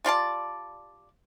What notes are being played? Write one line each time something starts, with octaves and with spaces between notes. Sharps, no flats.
G3 F4 D5 A5